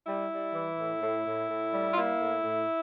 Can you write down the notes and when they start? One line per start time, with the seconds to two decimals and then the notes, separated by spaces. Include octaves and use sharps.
0.07 G3 E4
0.31 G3
0.54 E3
0.78 A2
1.02 A2
1.26 A2
1.49 A2
1.73 G3
1.92 F4
1.97 A#3 E4
2.20 A2
2.44 A2